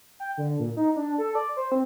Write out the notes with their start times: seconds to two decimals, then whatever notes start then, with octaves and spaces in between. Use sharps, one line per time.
0.20 G5
0.38 D3
0.59 A#2
0.77 D#4
0.96 D4
1.18 A4
1.35 D5
1.57 C5
1.72 C4